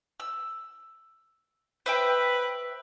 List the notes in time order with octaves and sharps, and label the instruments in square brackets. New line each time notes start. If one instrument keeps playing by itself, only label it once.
[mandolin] E6
[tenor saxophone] B4 [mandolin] C5 E5 G5